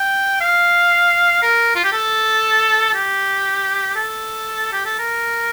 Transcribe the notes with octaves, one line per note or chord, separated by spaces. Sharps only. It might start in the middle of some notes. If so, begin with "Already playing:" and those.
Already playing: G5
F5
A#4
F4
G4
A4
G4
A4
G4
A4
A#4